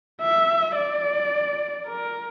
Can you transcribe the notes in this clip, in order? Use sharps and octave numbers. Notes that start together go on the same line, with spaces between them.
E5
D5
A#4